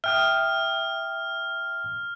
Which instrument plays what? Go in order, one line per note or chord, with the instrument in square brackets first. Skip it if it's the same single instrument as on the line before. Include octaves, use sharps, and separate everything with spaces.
[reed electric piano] E5 G5 D#6 [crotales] F6